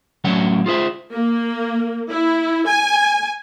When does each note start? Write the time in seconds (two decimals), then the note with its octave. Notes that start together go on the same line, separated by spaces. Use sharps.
0.24 A2 F#3 C#4 D4 E5 F#5
0.66 F4 G#4 C5 E5
1.12 A#3
2.11 E4
2.67 G#5